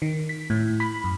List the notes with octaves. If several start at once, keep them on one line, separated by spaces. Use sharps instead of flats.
D#3
B6
A2
B5
F#2